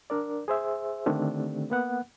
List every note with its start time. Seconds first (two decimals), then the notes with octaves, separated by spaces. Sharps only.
0.10 D4 A#4 D5
0.48 G#4 C5 E5
1.06 D3 D#3 A3 C4 D4 G4
1.70 A#3 B3 F#5